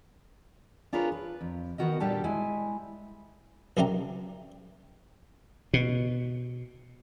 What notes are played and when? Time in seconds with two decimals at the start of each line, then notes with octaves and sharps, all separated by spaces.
0.93 D4 F4 G#4 A#4 B4 C#5
1.12 B4
1.41 F2
1.78 D#3 B3 F#4 A#4 D#5
2.00 A#2 G3 D4 G4 A4 A5
2.24 G#3 E4 G#5
3.77 B1 F#2 C3 D4 G4 A#5
5.74 B2